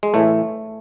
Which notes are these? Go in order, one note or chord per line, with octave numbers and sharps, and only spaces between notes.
G#3
A2 E3 A3